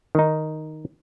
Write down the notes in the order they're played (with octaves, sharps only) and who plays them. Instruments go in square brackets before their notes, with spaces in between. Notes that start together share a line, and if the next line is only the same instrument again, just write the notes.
[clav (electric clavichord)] D#3 D#4